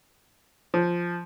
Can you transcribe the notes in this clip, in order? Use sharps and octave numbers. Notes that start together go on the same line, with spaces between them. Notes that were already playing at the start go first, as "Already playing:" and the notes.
F3